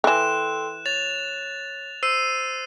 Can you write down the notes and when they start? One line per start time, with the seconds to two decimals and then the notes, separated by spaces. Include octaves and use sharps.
0.04 D#3 E3 A4 G5 C6 F#6 E7
0.86 C#5 A6 F7
2.03 C5 E6 C7 D#7